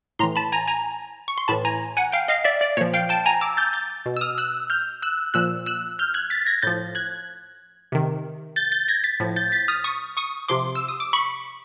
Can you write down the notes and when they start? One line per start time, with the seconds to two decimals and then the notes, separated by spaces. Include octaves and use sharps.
0.19 A2 A#5 C6
0.23 E3
0.36 A5 B5
0.52 G#5 A#5
0.68 G#5 A#5
1.28 C#6
1.38 C6
1.48 A2 E3 A5 B5
1.65 G#5 A#5
1.97 F#5 G#5
2.12 F5 G5
2.28 D#5 F5
2.44 D5 E5
2.61 D5
2.77 A#2 F3 C#5
2.94 F5 G5
3.09 G5 A5
3.26 G#5 A#5
3.41 D6 E6
3.57 G6 A6
3.73 G6 A6
4.06 B2
4.17 E6
4.21 D#6 F6
4.38 E6 F#6
4.70 F6 G6
5.02 E6 F#6
5.34 A#2 F3 E6 F#6
5.66 E6 F#6
5.99 F6 G6
6.14 F#6 G#6
6.30 A6 B6
6.46 G#6 A#6
6.62 A2 F3 G6 A6
6.95 F#6 G#6
7.92 C3 D#3
8.56 G6 A6
8.72 G6 A6
8.88 G#6 A#6
9.04 A6 B6
9.20 A2 F3
9.36 G6 A6
9.52 A6 B6
9.68 D#6 F6
9.84 C#6 D#6
10.17 C#6 D#6
10.48 C3 F3 C6 D6
10.75 E6
10.88 D#6
11.00 D6
11.13 B5 C#6